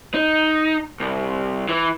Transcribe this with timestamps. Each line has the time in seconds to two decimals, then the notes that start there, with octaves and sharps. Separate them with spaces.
0.14 D#4
1.00 C2
1.69 E3